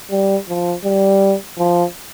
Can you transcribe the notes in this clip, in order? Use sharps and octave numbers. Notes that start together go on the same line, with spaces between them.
G3
F3
G3
F3